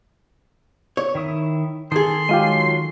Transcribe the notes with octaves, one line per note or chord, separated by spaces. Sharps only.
C#5
D#3 E4 D#6
D#3 G#4 A4 C6 D#6
F#3 G#3 F4 G4 A4 G#5